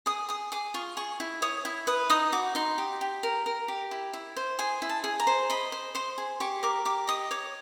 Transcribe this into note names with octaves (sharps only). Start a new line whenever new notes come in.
G#4 D#6
G#4 D#6
G#4 D6
F4 C#6
G#4 C#6
E4
C#5 D#6
E4
B4 D#6
D#4 D#6
F#4 D6
D#4 C6
G4
G4
A#4
A#4
G4
E4
E4
C5
G#4 G#5
E4
A5
G#4
A#5
C5
D#5 B5
C5
C5 C6
G#4
G4 C#6
A#4 D6
G4 D6
D#5 D#6
C#5 D6